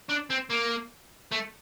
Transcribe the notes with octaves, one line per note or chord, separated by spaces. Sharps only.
D4
C4
A#3
A3